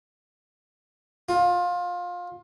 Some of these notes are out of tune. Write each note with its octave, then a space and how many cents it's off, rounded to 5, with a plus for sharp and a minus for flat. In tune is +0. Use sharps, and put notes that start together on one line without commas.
F4 +20